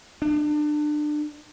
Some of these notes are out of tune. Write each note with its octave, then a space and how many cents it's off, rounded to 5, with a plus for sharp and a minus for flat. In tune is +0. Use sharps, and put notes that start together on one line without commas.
D4 +30